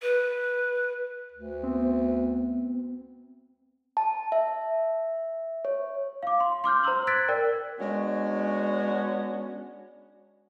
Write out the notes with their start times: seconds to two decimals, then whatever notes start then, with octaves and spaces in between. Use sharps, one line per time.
0.02 B4
1.32 D2
1.63 B3 C4
3.97 A5
4.32 E5
5.65 C#5
6.23 F5 D6
6.40 C6
6.64 C6 D6 F6 G6
6.83 C5 A#5 C6 E6 F#7
7.07 E6 F#6 G#6 A6 B6 D7
7.28 A#4 D5 G5
7.80 G#3 B3 C#4 D4 F#4